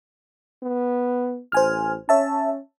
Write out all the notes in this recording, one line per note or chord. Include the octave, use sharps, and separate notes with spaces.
B3
A1 C5 G#5 F6
C#4 C#5 E5 A5